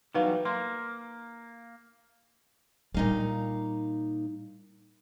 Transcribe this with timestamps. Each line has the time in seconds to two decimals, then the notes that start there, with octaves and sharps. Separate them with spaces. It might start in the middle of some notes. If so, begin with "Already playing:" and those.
0.15 E2 F#3 G3 D#4 B4 F5
0.45 A#3 C6
2.94 A#2 G3 D4 D#4 F5